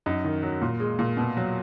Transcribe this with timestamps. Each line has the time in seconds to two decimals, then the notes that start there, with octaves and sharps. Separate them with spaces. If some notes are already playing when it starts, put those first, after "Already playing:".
0.06 F#2 D#4
0.24 D#3
0.43 F#3
0.62 A#2
0.80 G#3
0.99 A#2
1.17 B2
1.37 F#3